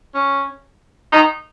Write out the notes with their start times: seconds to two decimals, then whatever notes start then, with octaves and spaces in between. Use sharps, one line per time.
0.15 C#4
1.12 D#4